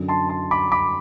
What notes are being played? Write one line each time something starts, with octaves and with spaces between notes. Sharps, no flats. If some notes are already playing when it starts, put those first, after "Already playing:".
Already playing: F#2 D3 F#3
A5 C6
A5 C6
B5 D6
B5 D6